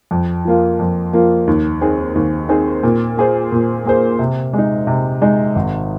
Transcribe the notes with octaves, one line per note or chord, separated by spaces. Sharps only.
F2
F3 A#3 F4
F2
F3 A#3 F4
D#2
D#3 C4 G#4 C5
D#2
D#3 C4 G#4 C5
A#2
A#3 G#4 C5
A#2
A#3 G#4 C5
C3
G#3 D#4
C3
G#3 D#4
G#1